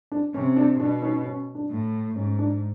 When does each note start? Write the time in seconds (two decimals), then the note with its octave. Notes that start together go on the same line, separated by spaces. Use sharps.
0.12 D4
0.34 C3 C#4
0.56 D4
0.80 B2 D4
1.02 C#4 D#4
1.25 C#4
1.55 D4
1.70 A2
2.16 G#2 C#4
2.39 D4